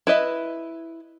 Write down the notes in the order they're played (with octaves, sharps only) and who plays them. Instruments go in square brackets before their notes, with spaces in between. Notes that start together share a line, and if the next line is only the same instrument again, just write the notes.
[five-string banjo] E4 B4 D#5 E5